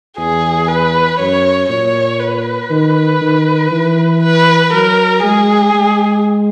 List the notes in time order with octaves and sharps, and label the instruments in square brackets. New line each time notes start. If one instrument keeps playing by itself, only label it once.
[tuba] E2 [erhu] G#4
[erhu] B4
[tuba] F#2 [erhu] C#5
[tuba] A#2 [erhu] C#5
[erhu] B4
[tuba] D#3
D#3
E3
[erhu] B4
[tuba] F#3 [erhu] A#4
[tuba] G#3 [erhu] G#4
[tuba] G#3